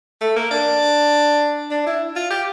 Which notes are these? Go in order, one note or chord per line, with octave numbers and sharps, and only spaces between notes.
A3
A#3
D4
D4
E4
F4
G4